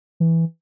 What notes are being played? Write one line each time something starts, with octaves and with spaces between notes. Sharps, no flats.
E3